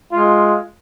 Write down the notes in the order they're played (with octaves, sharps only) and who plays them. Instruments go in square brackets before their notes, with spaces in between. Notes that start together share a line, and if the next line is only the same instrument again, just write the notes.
[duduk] G#3 [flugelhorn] F4